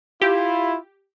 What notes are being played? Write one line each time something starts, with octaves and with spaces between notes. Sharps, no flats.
E4 F4 G4